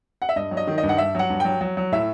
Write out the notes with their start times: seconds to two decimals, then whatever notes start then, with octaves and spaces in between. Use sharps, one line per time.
0.22 F#5
0.29 E5
0.36 G2 D#5
0.51 F#3
0.57 D#5
0.67 D#3
0.78 D#5
0.83 G2
0.89 F#5
0.98 G2 E5
1.15 F#3 F#5
1.30 G2
1.40 F#3 G5
1.61 F#3
1.77 F#3
1.92 A2 E5